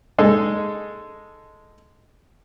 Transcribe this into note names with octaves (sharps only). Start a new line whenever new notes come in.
G#3 D#4 A4